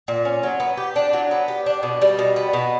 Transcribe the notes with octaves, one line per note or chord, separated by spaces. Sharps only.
A#2
C#4
F#3
B3
G4
D4
F#3
B3
G4
D4
B2
G3
B2
B3
B2